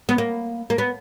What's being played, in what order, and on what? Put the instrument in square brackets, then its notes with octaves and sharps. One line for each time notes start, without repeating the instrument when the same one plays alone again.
[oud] B3
A#3
A#3
B3